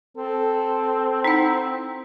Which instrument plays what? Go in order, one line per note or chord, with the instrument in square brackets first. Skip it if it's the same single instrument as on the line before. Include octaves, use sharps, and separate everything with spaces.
[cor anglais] C4 [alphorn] A4
[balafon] D#4 E4 F#5